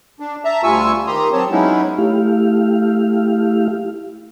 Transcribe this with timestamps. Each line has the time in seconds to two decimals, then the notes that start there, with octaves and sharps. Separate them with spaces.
0.20 D4
0.45 E5 A5 A#5
0.63 D2 G3 F4 G#5 C#6 E6
1.07 D#3 G4 A#5 C6 D#6
1.33 F#3 C4 C#5 A5
1.51 F#3 G#3 B3 C#4 D#4 E4
1.98 A3 E4 G4 F5